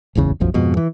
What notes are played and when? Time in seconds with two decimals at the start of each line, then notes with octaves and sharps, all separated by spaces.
0.15 D1 G#1 E2 C#3
0.40 D1 B1 F#2 F3
0.54 F2 G#2 B2
0.77 E3